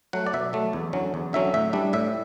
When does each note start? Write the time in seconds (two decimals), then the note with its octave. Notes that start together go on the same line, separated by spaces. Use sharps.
0.13 F#3 A3 F#5
0.27 D5
0.33 B2 E5
0.53 F#3 A3
0.73 E2
0.93 D3 F#3 C#4
1.14 E2
1.33 D3 F#3 C#4 E5
1.54 A2 E5
1.73 G3 D4
1.93 A2 E5